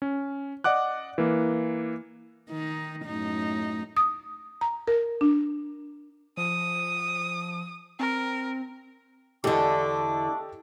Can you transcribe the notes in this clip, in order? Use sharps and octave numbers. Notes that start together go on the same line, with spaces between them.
C#4
D5 D#5 F#5 D6 F#6
E3 A#3
D#3 D#4
F#2 A2 D#4
D#6
A#5
A#4
D4
F3 D#6
C4 A#4
E2 D3 A3 D4 G4 A4 D#5 D6